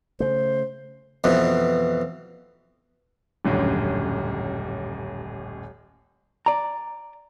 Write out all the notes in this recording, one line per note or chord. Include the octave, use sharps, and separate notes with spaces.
C#3 A3 C5
F2 B2 E3
D#1 A1 F#2 D3
D5 A#5